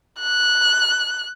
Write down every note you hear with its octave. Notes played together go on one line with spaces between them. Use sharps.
F#6